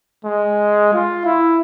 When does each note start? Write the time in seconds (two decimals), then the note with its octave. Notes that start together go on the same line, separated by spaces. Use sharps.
0.24 G#3
0.93 F4
1.25 E4